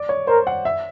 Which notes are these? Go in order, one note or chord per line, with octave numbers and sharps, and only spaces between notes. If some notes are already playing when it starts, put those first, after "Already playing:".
Already playing: D5
C#5
A#4 C5
F#5
E5